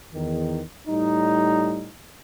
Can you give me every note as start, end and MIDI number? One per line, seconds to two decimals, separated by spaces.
0.13 0.59 40
0.13 0.59 51
0.88 1.88 45
0.88 1.88 55
0.88 1.88 63